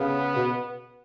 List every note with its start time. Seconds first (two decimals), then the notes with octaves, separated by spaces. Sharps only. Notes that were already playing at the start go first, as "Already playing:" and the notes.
Already playing: C#3 B3
0.35 B2